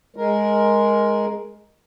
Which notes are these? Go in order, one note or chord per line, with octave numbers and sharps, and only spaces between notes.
G#3 A#4